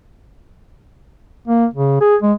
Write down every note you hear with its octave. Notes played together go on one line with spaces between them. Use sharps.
A#3
C#3
G#4
G#3